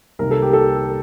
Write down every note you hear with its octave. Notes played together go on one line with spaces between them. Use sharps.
C2 C3 D#3 A#3 A#4
A4
G4
A4